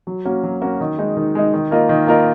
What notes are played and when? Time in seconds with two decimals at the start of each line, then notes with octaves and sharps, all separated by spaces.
0.07 F#3
0.25 A#3 C#4 F#4 A#4
0.43 F#3
0.62 A#3 C#4 F#4 A#4
0.80 D#3
0.98 G#3 D#4
1.17 D#3
1.35 G#3 D#4
1.54 D#3
1.71 A#3 F4 A#4 D#5
1.89 D#3
2.07 A#3 F4 A#4 D#5